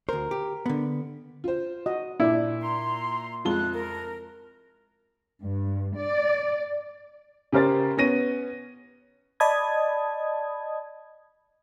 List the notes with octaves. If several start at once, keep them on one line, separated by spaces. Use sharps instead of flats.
D2 A#4 C5
G4
D3 B3
F4 C5
F#4 D#5
A#2 D4 E4 D5
A#5 C6
F2 G#3 F4 A5 F#6 G7
A#4
G2
D5
C#3 G4 A#4 C5 A6
B3 C#4 A#6 D#7
D5 D#5 A5 B5 D#6 G#6